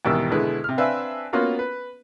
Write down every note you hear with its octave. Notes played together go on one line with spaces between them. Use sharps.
E2 G#2 B2 D#3 G3 E6
B2 D3 G#3 E4 G#4 B4
C3 F6
C4 D4 B4 E5 F5 G#5
A#3 B3 C#4 F4 F#4 A#4
B4